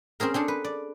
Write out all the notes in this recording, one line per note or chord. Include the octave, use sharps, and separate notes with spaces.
C4 C#4 G#4 A#4
C4 D4 G#4 A4
B4
D5